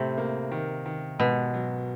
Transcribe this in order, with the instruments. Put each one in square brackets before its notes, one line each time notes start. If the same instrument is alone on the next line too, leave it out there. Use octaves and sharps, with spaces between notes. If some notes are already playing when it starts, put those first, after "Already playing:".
Already playing: [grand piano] A2 [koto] C3
[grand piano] A#3
D#3
D#3
[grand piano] G#2 [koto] B2
[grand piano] F#3